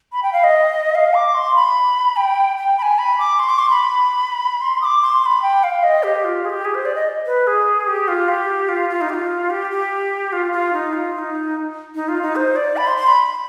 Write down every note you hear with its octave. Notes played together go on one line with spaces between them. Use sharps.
B5
G5
F5
D#5
F5
D6
C6
B5
G5
G5
B5
G#5
B5
D6
C6
D6
C6
B5
C6
D#6
D6
C6
C6
B5
G5
F5
D#5
G4
F4
G#4
G4
G#4
C5
D5
D#5
B4
G#4
G4
F4
G4
F4
F4
D#4
G4
F4
G4
G4
F4
F4
D#4
F4
F4
D#4
D#4
F4
D#4
C5
D5
B5
C6
C6
B5